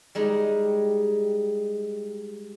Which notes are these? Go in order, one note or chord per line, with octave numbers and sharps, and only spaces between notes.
G3 G#3 D#4 G4